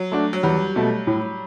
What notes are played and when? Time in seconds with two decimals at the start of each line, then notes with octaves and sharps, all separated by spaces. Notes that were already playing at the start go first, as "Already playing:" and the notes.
Already playing: F#3
0.12 A3 D4 F#4
0.33 F#3
0.43 E2 G3
0.76 B2 A3
1.07 A2